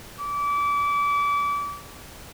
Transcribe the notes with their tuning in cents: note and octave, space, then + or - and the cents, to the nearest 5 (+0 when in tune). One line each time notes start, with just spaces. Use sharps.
D6 -30